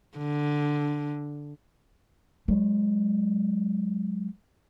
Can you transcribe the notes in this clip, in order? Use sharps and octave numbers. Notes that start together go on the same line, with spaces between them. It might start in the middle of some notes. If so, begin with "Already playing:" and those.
D3
F#3 G#3